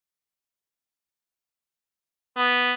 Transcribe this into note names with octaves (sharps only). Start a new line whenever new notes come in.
B3